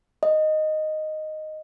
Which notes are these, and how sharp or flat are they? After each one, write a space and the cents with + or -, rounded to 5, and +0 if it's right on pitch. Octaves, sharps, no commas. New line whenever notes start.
D#5 -5